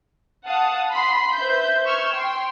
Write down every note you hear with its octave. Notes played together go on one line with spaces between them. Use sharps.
F5 F#5 A5 D#6
B5 C6 C7
B4 C5 E5 G6
C#6 E6 F6 G6 G#6
G5 C6